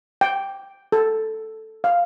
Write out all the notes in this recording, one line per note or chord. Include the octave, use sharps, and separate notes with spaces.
G5
A4
F5